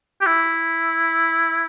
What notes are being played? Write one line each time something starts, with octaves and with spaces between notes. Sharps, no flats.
G4
E4